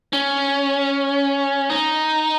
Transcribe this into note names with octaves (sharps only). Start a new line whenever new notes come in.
C#4
D#4